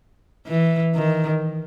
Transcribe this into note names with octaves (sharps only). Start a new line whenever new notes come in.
E3
D#3